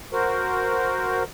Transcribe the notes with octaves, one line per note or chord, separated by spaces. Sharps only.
F#4 A#4 C5